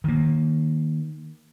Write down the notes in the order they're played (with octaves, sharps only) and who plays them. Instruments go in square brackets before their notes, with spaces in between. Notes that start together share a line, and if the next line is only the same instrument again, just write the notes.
[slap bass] D#3 A#3